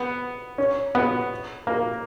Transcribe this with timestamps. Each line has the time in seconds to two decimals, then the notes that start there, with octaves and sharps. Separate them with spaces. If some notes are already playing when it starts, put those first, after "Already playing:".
Already playing: B3
0.58 C#4
0.95 B3
1.67 A#3